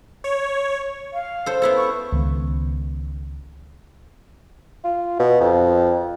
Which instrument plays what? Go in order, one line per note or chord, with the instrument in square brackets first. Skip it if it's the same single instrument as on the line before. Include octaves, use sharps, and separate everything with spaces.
[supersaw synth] C#5
[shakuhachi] F5
[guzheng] A4 C5
B3 E4 A4
[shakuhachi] C#6
[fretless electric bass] C#2 D#3 B3
[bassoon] F4
B2
F2